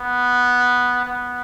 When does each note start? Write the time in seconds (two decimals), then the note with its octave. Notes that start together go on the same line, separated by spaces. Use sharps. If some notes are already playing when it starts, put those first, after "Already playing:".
Already playing: B3
1.05 B3